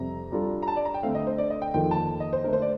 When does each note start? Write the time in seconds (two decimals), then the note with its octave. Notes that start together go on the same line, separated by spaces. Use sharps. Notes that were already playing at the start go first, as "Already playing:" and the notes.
Already playing: F2 C3 G3 C4 A#5
0.32 G3 D4 F4 A4
0.63 A#5
0.68 A5
0.76 D5
0.85 A#5
0.94 G5
1.03 D3 A3 C4 F5
1.15 D#5
1.27 C5
1.38 D5
1.50 D#5
1.62 G5
1.74 F2 D#3 A#3 F4 A4 G5
1.91 A5
2.20 D#5
2.33 C5
2.44 D3 A3 D4 A#4
2.53 C5
2.62 D5